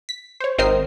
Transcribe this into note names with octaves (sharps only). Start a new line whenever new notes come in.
B6
C5 C#5
G#1 C4 A#4 C5 D#5 C7